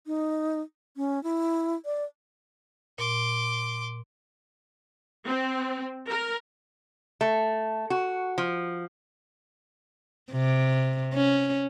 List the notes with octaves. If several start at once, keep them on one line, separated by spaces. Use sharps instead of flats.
D#4
C#4
E4
D5
A#2 C6 D6
C4
A#4
A3
F#4
F3
C3
C#4